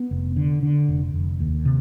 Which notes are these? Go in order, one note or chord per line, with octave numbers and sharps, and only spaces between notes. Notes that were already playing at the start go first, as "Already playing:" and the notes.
Already playing: B3
F1
D3
D3
F1
F1
D#2
C3